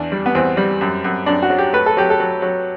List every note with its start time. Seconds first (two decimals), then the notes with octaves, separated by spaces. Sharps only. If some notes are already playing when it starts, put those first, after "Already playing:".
Already playing: E2 D4
0.12 G3
0.26 B3
0.35 E2 C4
0.57 G3
0.81 F#2
1.04 F#2
1.26 F#2 D4
1.42 F#4
1.50 F#3
1.58 G4
1.73 A3 B4
1.86 A4
1.97 F#3 G4
2.10 A4
2.20 F#3
2.42 F#3